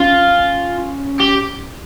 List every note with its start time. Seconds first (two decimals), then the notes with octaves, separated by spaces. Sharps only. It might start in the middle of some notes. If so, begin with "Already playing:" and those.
Already playing: C#4 F4
1.20 G4